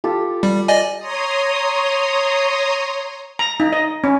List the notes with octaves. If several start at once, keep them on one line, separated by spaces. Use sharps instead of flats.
F4 G4 A4
G3
D5 D#5 G#5
C#5 A#5 C6 D#6
A#5
D#4
D#5
C#4